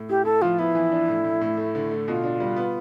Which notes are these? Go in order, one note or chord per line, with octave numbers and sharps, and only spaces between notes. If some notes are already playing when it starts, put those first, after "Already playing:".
Already playing: A2
E4 G4
E4 A4
F3 F4
B3 E4
E3
D4
A2
A2
A2
A3
D3
A3
B2 F4
D4
G3
B3